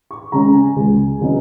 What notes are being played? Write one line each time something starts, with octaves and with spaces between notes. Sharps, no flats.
C#6
C#3 G#3 C#4 A#5
G#5
C#2
C#3 F#3 B3 D#4